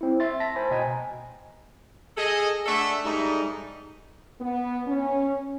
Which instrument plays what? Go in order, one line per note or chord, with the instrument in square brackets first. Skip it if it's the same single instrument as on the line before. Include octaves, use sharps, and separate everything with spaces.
[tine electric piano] C4 E4
E5 C6 A6
A5 A#6 B6
C5 G#5 B5
B2 D#5 G5 G#5 A#5
[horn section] G#4 A4 D#5
A3 D4 A4 D5 E5 F#5
G#2 G3 A3 D#4
[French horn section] B3
C#4